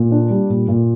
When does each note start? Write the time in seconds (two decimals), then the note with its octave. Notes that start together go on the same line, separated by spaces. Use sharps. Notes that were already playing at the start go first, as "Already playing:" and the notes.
Already playing: A#2
0.11 D4
0.30 G3
0.50 A#2
0.68 A#2